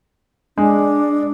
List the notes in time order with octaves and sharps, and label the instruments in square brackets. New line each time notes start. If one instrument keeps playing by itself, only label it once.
[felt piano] G#3 [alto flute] D4